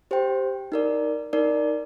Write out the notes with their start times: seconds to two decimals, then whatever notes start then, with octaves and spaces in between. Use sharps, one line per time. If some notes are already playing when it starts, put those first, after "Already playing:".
0.11 G4 C5 G5
0.72 D#4 A#4 D5
1.33 D#4 A#4 D5